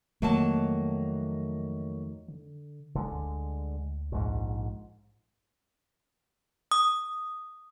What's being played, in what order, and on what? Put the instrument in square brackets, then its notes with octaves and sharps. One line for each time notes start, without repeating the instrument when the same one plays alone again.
[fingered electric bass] F2 D#3 A3 [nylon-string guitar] F#3 A#3 A5
[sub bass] D3
[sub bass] F1 [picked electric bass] D3 G#3
[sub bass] D2
[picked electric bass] A#1 G#2
[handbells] D#6